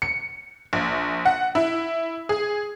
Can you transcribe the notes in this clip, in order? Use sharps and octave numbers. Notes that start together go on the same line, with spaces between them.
C#7
A#1
F#5
E4
G#4